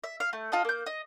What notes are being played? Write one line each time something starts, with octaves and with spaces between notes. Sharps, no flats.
E5
F5
A3
F4 A4 D#5
A#3 G6
D#5